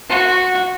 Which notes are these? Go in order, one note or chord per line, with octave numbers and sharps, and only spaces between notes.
F#4